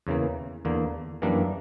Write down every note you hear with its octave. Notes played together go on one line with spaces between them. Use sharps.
E2 C#3 E3 A#3
E2 D3 A#3
F#2 E3 G3 A#3 D4